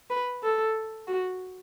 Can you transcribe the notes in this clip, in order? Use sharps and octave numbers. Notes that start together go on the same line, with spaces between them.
B4
A4
F#4